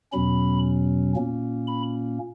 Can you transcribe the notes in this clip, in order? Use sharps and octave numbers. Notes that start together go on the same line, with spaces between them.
E2 B2 F#3 C#4 B5
A#2 A#3 C#4
B5